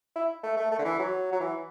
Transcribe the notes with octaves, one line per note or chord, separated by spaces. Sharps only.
E4
A3
A3
A3
D3
E3
F#3
F#3
E3